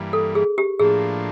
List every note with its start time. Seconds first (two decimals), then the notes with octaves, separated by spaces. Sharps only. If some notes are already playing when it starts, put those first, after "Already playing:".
Already playing: G2 E3 G3 A#3
0.13 A4
0.35 G#4
0.58 G4
0.79 A2 F3 A#3 D4 G#4